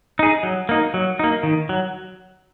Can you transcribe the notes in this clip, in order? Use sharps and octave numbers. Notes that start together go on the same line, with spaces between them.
D#4 G#4
F#3
A#3 D#4
F#3
A#3 D#4
D#3
F#3